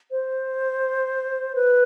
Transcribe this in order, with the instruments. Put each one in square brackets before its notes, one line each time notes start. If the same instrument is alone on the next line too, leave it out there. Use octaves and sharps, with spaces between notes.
[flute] C5
B4